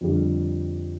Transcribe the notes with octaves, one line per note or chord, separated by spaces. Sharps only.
F2 D3 G3